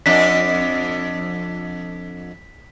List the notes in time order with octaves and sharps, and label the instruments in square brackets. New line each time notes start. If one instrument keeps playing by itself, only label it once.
[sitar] F2 D4 [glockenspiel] B6